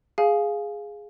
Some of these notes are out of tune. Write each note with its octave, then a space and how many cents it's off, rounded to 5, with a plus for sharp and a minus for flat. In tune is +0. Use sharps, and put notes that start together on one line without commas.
G#4 +0 F5 +0 G#5 +25